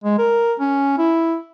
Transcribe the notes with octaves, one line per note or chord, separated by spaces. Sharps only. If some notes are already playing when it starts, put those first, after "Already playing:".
G#3
A#4
C#4
E4